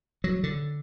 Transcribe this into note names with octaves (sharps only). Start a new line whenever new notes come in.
F#3
D3